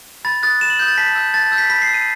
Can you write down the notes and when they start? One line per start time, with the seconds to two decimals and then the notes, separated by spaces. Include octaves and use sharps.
0.25 B5 A6
0.43 D#6 F#6 A6
0.61 B5 E7
0.70 F#7
0.79 D#6 F#6 G6
0.88 A6
0.98 A5 B6
1.15 E6 G6
1.34 A5 A6
1.46 A6
1.52 E6 G6
1.58 B6
1.70 B5 B6
1.82 C7
1.88 E6 G6
1.94 D#7